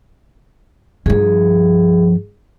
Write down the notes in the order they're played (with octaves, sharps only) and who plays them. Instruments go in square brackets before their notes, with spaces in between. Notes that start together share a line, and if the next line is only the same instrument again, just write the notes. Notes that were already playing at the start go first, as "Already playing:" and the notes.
[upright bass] G2 F3 [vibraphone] G#4